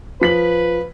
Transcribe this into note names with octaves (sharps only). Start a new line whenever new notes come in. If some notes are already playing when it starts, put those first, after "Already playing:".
F3 B4 B6 F#7